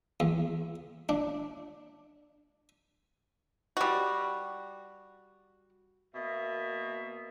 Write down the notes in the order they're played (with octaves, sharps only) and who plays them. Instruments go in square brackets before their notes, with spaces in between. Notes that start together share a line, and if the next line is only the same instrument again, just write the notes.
[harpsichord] E2
D4
[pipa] G3 F#4
[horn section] B2 A#3 E5